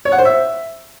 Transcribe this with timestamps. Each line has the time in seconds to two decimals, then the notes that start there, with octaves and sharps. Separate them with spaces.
0.05 C#5
0.12 F#5
0.18 C5
0.25 E5